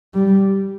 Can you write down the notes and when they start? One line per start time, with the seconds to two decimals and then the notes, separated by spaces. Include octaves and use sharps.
0.14 G3